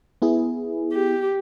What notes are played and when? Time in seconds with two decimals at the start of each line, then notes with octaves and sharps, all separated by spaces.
0.22 B3 E4 G#4
0.93 G4